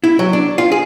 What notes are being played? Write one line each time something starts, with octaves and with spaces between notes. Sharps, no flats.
E4
F#3
D4
F4
G#4